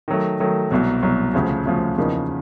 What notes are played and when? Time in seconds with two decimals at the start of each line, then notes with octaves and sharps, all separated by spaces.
0.08 D#3 F#3 A3
0.40 D#3 F#3 A3
0.71 C2 B2 F#3
1.03 C2 B2 F#3
1.34 D2 C#3 F3
1.66 D2 C#3 F3
1.97 E2 C#3 F3 A#3 D#4